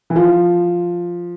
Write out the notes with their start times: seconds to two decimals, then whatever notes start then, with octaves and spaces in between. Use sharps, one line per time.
0.10 E3
0.16 F3